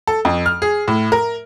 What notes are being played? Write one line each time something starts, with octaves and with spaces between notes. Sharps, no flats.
A4
F2
F6
G#4
A2
A#4